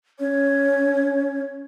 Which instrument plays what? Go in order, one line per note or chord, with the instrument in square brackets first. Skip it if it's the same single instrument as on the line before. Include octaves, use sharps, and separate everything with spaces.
[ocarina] C#4 [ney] C#5